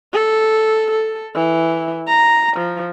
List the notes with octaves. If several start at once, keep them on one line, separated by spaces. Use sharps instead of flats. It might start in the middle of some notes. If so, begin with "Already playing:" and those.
A4
A4
E3
A#5
F3